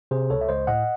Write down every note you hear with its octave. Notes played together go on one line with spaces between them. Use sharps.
C3 G#4 C5
C#2 A4 C#5
E5
C#2 C5 D#5
A2 D#5 F#5